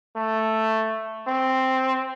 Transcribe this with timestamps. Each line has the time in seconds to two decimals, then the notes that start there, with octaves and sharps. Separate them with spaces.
0.17 A3
1.28 C4